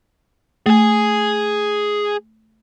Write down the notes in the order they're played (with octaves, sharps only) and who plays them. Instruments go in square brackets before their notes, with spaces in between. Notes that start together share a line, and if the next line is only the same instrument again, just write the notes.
[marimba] A3 [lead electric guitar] G#4 G#5